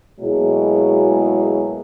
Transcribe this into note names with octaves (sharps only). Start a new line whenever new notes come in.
B2 F#3 G#3 A#3 E4 G#4